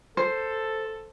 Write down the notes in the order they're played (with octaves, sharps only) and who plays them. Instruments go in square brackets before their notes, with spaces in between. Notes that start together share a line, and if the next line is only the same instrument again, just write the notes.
[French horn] A4 [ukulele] C5